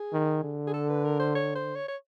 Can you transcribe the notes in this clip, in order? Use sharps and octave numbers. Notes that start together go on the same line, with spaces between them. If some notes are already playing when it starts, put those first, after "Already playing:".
Already playing: G#4
D#3
D3
G#4
A4
B4
A#4
C5
C#5
C5
C#5
C#5